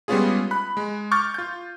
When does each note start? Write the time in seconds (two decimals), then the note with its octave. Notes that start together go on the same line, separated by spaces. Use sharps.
0.08 G3 G#3 B3 C#4 F4 G#4
0.51 B5 F#6
0.77 G#3
1.11 C#6 D6 F6 G6 A6
1.34 F4 G6